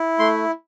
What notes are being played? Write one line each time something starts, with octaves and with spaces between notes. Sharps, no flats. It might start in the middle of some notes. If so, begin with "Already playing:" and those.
Already playing: E4
A3 C6